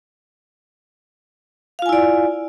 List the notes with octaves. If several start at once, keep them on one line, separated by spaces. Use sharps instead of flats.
E4 F4 D5 F5 G#5